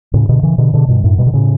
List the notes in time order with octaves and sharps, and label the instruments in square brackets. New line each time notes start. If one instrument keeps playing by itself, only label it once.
[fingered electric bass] A2 C#3
B2 D3
C#3 E3
B2 D3
B2 D3
G2 B2
F#2 A2
G2 B2
D3
A2 C#3